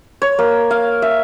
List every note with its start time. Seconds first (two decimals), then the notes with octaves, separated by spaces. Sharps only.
0.22 C#5
0.39 A#3
0.71 F5
1.02 E5